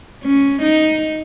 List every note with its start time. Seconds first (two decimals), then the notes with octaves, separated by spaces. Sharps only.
0.23 C#4
0.62 D#4